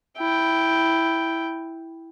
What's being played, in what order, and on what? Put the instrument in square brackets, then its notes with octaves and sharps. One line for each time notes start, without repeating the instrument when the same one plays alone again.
[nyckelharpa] E4 G5